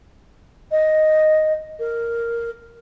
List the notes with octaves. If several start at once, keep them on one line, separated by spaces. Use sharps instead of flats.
D#5
A#4